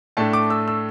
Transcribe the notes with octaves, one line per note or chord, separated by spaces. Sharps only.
A2 A3 D4 A5
D6
E6
E6